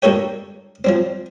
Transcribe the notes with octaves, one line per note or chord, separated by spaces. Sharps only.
G2 A#3 F#4 A4 C#5 G5
F3 F#3 C4